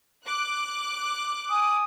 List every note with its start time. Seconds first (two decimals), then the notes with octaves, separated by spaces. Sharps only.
0.25 D6 F#6
1.50 G#5 D#6